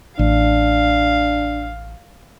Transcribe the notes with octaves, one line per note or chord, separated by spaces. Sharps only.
A1 D4 F5